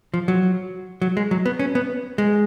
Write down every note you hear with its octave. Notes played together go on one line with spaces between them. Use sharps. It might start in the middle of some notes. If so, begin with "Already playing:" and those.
F3
F#3
F#3
G#3
F#3
B3
C#4
B3
G#3